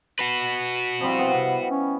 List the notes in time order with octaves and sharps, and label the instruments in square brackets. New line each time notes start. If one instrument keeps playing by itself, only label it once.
[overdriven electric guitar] F#4 B4
[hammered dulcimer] F3 G3 E4 [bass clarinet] C4
[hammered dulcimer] B3
[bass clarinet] C3
C#4